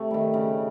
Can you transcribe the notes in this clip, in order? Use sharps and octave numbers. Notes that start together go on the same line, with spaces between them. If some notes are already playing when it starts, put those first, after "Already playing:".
Already playing: C3 A3
D#3 G3
C#3